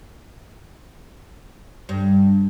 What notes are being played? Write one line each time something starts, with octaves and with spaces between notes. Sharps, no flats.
G2